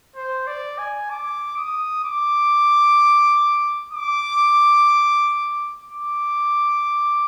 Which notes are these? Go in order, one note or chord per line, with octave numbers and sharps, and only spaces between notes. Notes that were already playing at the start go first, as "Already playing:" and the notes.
C5
D5
G#5
D6
D#6
D6
D6
D6